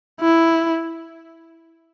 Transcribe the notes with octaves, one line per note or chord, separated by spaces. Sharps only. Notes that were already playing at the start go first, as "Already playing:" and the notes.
E4